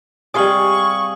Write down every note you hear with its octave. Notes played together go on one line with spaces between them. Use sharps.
C3 G3 G#4 F5 C#6 D#6 F#7